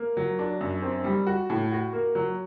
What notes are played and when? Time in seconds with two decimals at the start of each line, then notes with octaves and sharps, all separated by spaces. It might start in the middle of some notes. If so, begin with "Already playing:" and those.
Already playing: A#3
0.17 F#3
0.39 D4
0.61 F#2
0.82 C4
1.04 G3
1.27 F#4
1.50 A2
1.72 F#4
1.93 A#3
2.15 F#3